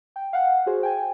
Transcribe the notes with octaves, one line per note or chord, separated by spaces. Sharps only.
G5
F5 F#5
F#4 G#4 C5
G5 G#5